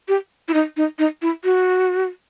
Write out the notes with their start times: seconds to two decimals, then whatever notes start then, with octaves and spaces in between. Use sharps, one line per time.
0.08 G4
0.48 E4
0.54 D#4
0.77 D#4
0.99 D#4
1.22 E4
1.44 F#4